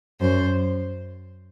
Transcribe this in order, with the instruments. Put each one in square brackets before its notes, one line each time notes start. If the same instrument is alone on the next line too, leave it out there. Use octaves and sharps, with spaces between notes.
[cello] F#2 [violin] C5